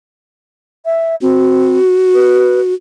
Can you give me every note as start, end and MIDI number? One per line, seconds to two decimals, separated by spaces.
0.85 1.15 76
1.22 1.79 60
1.22 2.74 66
2.14 2.60 71